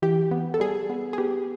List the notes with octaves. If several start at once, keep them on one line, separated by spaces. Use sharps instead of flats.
E3 G4
B3
A4
G3 G#4
B3
G#4
B3 G4